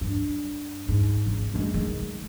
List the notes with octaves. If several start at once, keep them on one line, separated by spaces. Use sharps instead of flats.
G2
G#2
G#1
F#2 G#3
D#3 G#3